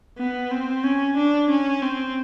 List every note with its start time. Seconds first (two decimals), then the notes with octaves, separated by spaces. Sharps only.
0.18 B3
0.51 C4
0.84 C#4
1.17 D4
1.50 C#4
1.83 C4